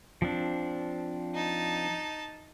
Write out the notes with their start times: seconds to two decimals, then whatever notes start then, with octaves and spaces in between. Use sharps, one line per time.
0.22 F3 C4 D4
1.34 D#4 A5